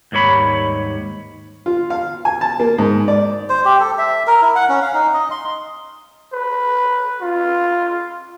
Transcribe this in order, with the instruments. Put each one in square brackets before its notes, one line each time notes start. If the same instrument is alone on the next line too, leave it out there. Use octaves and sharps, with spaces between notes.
[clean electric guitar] D#2 G#2 G3 C#5 B5
[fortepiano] F4
F5
G#5
A5
A#3
G#2
D5
[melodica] C5
G4
A4
E5
A#4
E4
F#5
C#4
F5
D#4
D#5
C6
[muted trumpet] B4
F4